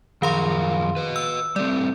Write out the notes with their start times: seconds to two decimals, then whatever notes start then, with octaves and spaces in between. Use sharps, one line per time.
0.22 F#2 D#3 F3 A#4 F5 C6
0.96 B4 D#5
1.16 E6
1.56 G3 A3 C4 D5